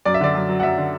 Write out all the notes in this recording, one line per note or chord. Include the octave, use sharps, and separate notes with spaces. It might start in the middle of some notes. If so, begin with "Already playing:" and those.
F#2 D5
E5
D3 D5
F#2
F#3
F#5
F#2 E5
D3